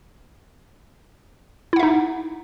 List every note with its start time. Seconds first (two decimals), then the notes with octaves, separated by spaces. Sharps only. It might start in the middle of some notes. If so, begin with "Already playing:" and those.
1.73 E4
1.76 F#5
1.80 E5
1.83 D#4